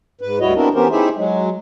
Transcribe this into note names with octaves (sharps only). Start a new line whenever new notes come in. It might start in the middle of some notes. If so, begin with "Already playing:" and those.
G#2 B4
D2 G3 E4 F#4 C#5 D#5
B3 C4 D4 E4 F#4 A#4
E3 B3 C#4 G4 A#4 C5
D#4 E4 G4 G#4 C5 E5
F#3 G#3